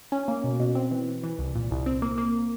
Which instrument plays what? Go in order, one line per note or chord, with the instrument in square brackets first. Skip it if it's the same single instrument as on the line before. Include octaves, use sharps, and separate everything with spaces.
[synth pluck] C#4
A#3
B2
B2
C4
E3
E3
E3
C2
A#2
C2
C4
A#3
A#3